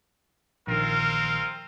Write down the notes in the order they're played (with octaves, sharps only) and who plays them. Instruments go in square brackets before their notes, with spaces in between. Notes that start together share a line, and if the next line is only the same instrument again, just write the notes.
[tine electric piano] A#1 D#3 [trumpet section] C4 F4 A#4